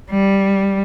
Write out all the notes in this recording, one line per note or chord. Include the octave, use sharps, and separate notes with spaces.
G3